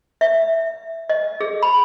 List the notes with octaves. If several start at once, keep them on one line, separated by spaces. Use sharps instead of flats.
E5
D#5
G#4
B5